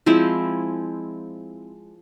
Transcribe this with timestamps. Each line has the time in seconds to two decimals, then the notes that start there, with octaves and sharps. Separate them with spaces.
0.06 F3 G#3 C4 E4